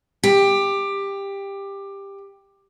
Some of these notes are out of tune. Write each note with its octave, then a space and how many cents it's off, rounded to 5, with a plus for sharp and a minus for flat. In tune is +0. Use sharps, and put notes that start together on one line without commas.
G4 +15